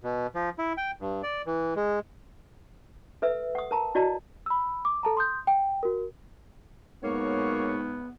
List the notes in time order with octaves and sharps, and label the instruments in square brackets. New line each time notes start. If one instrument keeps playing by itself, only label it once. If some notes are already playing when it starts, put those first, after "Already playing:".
[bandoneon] B2
F3
E4
G5
G2
D5
E3
G#3
[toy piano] A4 B4 E5 E6
F#5 D#6
A#4 A5 A#5
E4 F#4 D5 D#5 A5
[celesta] B5 E6
D6
A4 A5 A#5
C6 D#6 G6
G5
F#4 A#4
[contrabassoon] G#2 [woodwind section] F#3 C#5 C#6 [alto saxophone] A#3 [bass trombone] B3